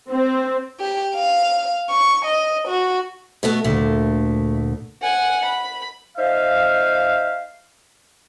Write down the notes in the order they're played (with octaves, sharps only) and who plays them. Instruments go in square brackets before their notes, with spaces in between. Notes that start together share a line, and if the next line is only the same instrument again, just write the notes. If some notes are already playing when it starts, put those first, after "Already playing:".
[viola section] C4
[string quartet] G4
F5
C#6
D#5
F#4
[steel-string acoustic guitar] B2 A3 B3
[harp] D2 A#2 [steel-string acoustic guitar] A3
[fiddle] F#5 G#5
B5
[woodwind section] D#4 C5 E5 F5